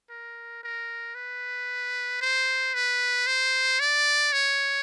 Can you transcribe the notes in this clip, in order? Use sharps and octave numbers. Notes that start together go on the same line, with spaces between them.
A#4
A#4
B4
C5
B4
C5
D5
C#5